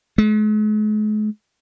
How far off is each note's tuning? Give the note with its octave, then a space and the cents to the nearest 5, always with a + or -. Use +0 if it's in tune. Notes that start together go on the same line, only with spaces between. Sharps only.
G#3 +45